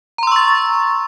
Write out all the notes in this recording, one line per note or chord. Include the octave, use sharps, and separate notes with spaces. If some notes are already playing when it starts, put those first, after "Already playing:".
A#5 C6 C#6 E6 A6